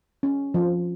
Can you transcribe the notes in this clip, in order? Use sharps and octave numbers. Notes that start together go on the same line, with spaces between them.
C#4
F3